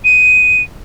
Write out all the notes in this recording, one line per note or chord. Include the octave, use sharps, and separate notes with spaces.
D#7